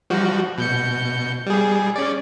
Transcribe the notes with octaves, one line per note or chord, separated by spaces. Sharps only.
F3 G3 F#4
B2 G6 C#7
G3 G#4
C#4 D5